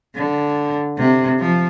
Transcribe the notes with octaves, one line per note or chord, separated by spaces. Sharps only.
D3
C3
F3